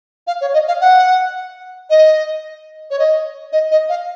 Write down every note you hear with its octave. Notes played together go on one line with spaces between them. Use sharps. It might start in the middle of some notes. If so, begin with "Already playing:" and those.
F5
C#5
D#5
F5
F#5
D#5
C#5
D#5
D#5
D#5
F5